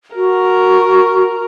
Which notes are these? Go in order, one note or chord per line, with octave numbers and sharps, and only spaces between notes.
F#4 A#4